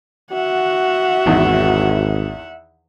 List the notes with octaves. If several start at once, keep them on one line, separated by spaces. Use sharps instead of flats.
F#4 E5 F#5
G#1 E2 D#3 E4